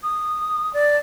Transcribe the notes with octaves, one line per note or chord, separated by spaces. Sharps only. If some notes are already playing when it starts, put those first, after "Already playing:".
D#6
D5